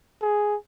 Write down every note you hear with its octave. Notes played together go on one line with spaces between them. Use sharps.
G#4